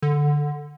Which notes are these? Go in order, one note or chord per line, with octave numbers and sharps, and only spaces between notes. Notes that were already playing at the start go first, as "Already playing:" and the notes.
D3